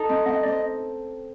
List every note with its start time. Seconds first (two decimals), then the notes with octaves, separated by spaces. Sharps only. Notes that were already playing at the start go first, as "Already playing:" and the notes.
Already playing: D#4 A4
0.09 C4 D#5
0.26 F#5
0.29 C4 D#5
0.43 D5
0.47 C4 D#5